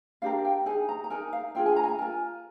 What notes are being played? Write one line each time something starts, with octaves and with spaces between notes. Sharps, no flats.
D4 G4 A#4 F5
G5
D#4 G#4 G#5
A#5
A#5
D#4 A#4 G#5
F5
D4 F4 G#4 G5
G#5
A#5
G#5
A#5
F4 A#4 G#5